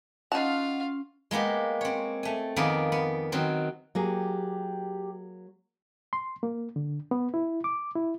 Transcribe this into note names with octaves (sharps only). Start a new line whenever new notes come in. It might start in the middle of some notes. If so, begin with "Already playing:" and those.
C#4 D#4 F4 F5 F#5 A5
G#3 A#3 B3 G4
C4 C#5
A3 G#5
F2 D#3 A#3 B3 G#4 D5
B3
D#3 F#3 C4
F#3 A#3 G4 G#4
C6
A#3
D3
B3
E4
D6
E4